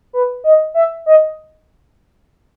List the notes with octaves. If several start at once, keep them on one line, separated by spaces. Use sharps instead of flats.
B4
D#5
E5
D#5